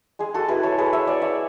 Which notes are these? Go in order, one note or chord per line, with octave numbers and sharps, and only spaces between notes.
G#3 G#4
F#4 A4
E4 G#4 B4
A4 C#5
G#3 G#4 B4
C#5 E5
B3 D5 F#5
C#5 E5